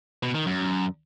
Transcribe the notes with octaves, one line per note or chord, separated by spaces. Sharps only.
B2
D#3
F#2